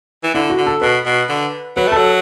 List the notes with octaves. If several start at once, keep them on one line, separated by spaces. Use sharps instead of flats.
E3
D3 E4
F#4
D3
A4
B2 B4
B2
D3
F#3 B4
A3 A4
F#3